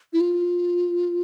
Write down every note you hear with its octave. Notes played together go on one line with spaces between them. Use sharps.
E4
F4